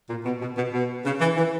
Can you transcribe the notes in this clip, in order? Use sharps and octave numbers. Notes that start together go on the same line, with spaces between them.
A#2
B2
B2
B2
B2
C#3
E3
E3